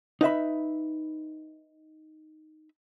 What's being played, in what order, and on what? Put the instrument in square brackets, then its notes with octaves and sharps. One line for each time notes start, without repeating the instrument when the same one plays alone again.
[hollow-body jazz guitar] D#4 B4 E5 B5